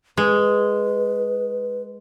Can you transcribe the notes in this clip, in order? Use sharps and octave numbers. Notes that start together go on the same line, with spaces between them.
G#3 B4